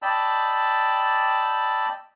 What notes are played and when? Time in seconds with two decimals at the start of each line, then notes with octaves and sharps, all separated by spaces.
0.02 D5 D#5 G5 A5 B5 E6